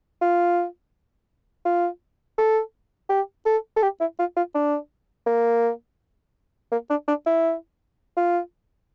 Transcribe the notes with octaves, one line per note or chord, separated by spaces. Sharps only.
F4
F4
A4
G4
A4
A4
G4
E4
F4
F4
D4
A#3
A#3
D4
D4
E4
F4